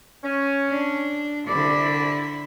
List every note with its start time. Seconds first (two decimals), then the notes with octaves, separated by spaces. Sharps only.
0.24 C#4
0.69 D4
1.48 C2 D3 E4 D5